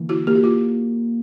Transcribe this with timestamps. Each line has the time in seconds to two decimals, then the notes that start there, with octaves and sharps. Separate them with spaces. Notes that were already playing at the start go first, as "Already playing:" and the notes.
Already playing: D3 E3 A#3
0.09 E4 F#4
0.27 A#3 G4
0.35 F#4
0.44 F4